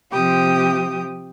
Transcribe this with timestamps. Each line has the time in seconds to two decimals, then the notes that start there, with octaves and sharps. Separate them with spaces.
0.12 C3 F3 G4 G5 D#6